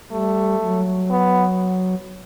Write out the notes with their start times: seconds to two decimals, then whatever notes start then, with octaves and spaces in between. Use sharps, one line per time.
0.11 G3 A3
0.61 F#3
1.10 B3